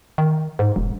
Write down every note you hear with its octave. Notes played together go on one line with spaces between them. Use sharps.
D#3
G#2
E1